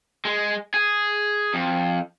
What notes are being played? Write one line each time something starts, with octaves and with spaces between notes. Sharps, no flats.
G#3
G#4
F2